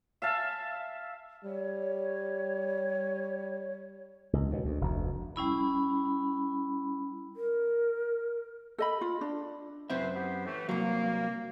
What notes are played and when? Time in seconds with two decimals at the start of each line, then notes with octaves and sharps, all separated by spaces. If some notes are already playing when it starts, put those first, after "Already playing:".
0.22 E5 F5 A5
1.44 G3 C#5
4.33 C#2
4.50 D#2 B2
4.65 D2
4.81 F1 D2
5.36 G3 C#4 E4 B5
7.36 A#4
8.79 A4 D#5 B5
9.01 F4
9.21 D4
9.90 F#2 C4 E4 B4 C5 E5
10.15 B3 G4 C5
10.45 A2 E3 A3
10.69 C2 F#3 A#3